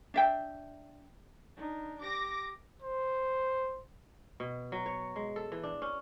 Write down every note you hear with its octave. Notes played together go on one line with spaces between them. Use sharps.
D4 E5 G5
D4 D#4
G4 D6 A#6
C5
B2
F#3
C#5
G#3
A4
E3
D4
C#4